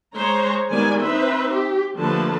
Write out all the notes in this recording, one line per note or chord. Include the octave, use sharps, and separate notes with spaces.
G#3 C5 C#5 A#5
D#3 G3 G#3 B3 D5 G#5
C4 D#4 B4 C5 E5
G4
D3 F3 A3 A#3 B4 A5